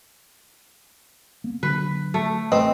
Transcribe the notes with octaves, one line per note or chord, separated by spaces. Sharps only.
A#3 B3
D3 F#3 D4 B4
A3
A1 A3 C4 B4 D#5